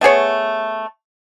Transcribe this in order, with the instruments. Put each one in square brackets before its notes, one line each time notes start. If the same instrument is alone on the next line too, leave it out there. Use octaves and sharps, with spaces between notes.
[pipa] A3 B3 G#4 C#5